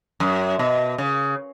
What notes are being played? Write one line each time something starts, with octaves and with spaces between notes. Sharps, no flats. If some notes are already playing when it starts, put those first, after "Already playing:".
F#2
B2
C#3